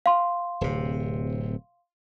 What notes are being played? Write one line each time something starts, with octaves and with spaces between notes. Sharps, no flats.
F5 C6
D1 C3